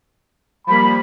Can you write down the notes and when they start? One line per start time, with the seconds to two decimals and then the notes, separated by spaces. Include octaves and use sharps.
0.67 F3 G3 A#3 B5